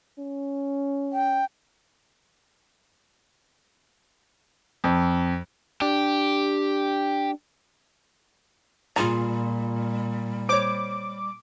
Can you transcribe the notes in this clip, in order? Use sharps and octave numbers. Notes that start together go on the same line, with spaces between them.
C#4
G5
F2
D4 G4
A#2 G3 F4 G#4 A#5
C5 C#5 D6